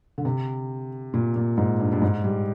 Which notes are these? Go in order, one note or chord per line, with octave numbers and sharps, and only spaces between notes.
D3
C3
A#2
A#2
G#2
G2
G2
G#2
G3